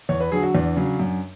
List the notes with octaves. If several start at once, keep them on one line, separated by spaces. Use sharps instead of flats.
E2 C#5
B4
D3 F#3 G#4
F#4
E2 D4
C#3 F#3
F#2